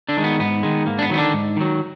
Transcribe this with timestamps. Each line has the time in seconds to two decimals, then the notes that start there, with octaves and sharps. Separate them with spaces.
0.09 D3 D4
0.17 D#3 G#3
0.24 B3
0.40 G#2 B3
0.63 D#3 G#3
0.86 G#2 A#3
0.99 D4
1.02 B3
1.10 D#3 F#3
1.14 B3
1.18 D3 D4
1.33 G#2
1.57 D#3 F#3